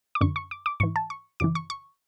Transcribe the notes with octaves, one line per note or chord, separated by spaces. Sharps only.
D6
F#2 D3 C#6
C#6
D6
D6
G#2 E3 C#6
A5
C#6
F#2 C#3 E3 D6
C#6
C#6